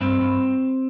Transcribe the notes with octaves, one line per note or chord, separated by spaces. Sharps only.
G2 C4
G2